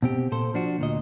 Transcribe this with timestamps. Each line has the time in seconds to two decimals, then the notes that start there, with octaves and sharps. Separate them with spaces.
0.02 B2 C4 G4
0.32 A#2 A4 C5
0.54 F3 D4 F#4
0.79 D2 A#2 D#5